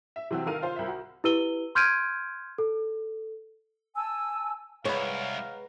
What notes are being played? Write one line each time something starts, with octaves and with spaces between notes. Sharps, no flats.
E5
C3 E3 C4 F#4
D#3 A4 A#4 F5 F6 D#7
F4 C5 F5
C2 E5
F#4
E4 G4 B4 E6 D#7 G7
C6 F6 G6 G#6 D7 D#7
A4
G#5 A5 E6
C2 G#3 B4 C#5 F5 F#5 A#5